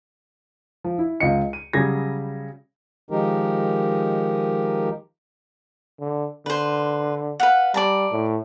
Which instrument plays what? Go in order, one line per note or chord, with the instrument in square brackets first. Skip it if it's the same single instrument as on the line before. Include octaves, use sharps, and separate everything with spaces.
[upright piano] F3
E4
C#2 F4 D#5 C#7
D#7
C#3 F#3 G3 G#4 G#6 A#6
[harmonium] D#3 F3 G#3 D#4 G4 A#4
[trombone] D3
[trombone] D3 [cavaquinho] B4 C5
[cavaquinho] B4 F5 F#5
[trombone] G3 [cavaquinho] D5 A5 A#5
[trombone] A2